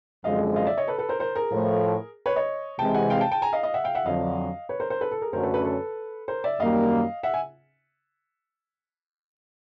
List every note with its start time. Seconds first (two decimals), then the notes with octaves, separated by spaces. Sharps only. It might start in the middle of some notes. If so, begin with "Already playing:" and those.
0.24 F#2 D3 F3 G#3 C4 D#5 F5
0.56 D#5 F5
0.67 D5 E5
0.78 C#5 D#5
0.88 A4 B4
0.98 A4 B4
1.09 A#4 C5
1.20 A#4 C5
1.35 G#4 A#4
1.52 A2 F3 A3
2.26 B4 C#5
2.36 C#5 D#5
2.79 C3 E3 G#3 G5 A5
2.94 F#5 G#5
3.10 F5 G5
3.21 G5 A5
3.31 G5 A5
3.42 G#5 A#5
3.53 D#5 F5
3.63 D#5 F5
3.74 E5 F#5
3.84 F5 G5
3.95 E5 F#5
4.06 F2 D3 F#3 D#5 F5
4.69 B4 C#5
4.80 A#4 C5
4.90 A#4 C5
5.01 A4 B4
5.11 A4
5.22 G#4 A#4
5.33 F#2 D3 F#3 A3 C#4 A#4 C5
5.43 A4 B4
5.54 A4 B4
5.64 A4 B4
6.28 A#4 C5
6.44 D5 E5
6.60 F#2 D#3 G3 A#3 D#5 F5
7.23 E5 F#5
7.34 G#5